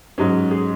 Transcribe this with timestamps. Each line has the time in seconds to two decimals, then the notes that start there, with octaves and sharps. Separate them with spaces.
0.18 G#2 F#3 C#4
0.51 G#4